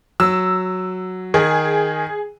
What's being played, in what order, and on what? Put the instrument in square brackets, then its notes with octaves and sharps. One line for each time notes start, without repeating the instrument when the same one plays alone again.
[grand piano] F#3 [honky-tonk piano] E6
[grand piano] D#3 [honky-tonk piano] G#4